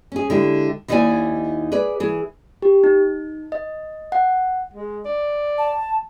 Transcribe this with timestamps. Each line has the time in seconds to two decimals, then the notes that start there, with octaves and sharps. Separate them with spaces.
0.12 C#4 G#4
0.30 D3 G#3 E4 G4
0.88 D#2 D#4 E4 C5 D5 G#5
1.72 G#4 B4 D5
2.00 E3 G#4
2.62 G4
2.84 D#4
3.52 D#5
4.12 F#5
4.74 G#3
5.05 D5
5.58 A5